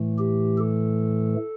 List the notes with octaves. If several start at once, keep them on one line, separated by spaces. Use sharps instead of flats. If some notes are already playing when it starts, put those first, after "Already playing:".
Already playing: A2 E3 A3
G4
A4